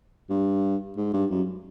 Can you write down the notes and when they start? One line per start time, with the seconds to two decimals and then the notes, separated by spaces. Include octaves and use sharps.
0.29 G2
0.97 G#2
1.13 G2
1.30 F#2